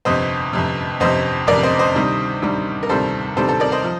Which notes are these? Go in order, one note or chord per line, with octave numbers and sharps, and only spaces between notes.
G1 F2 C3 C5 D#5
G1 F2 C3
G1 F2 C3 C5 D#5
G1 F2 C3 A#4 D5
C5 D#5
C5 D#5
D2 C3 D#3 G3
D2 C3 D#3 G3
A#4
D2 C3 D#3 G3 A4 C5
D2 C3 D#3 G3 A4 C5
A4 C5
A#4 D5
C5 D#5
F3